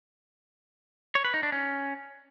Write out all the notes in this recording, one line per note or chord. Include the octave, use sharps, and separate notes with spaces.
C#5
B4
D#4
D4
C#4